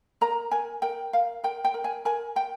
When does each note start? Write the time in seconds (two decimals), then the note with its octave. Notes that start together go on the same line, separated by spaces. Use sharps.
0.21 A#4 A#5
0.51 A#4 G#5
0.82 A#4 G5
1.13 A#4 F5
1.44 A#4 G5
1.65 G5
1.74 A#4
1.84 G#5
2.05 A#4 G#5
2.36 A#4 G5